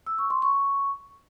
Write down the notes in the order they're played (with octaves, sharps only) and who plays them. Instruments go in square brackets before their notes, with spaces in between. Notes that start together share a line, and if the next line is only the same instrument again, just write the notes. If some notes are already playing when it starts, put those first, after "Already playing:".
[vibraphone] E6
C#6
C6
C#6